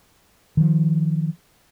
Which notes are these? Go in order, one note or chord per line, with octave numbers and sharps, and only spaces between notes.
D#3 F3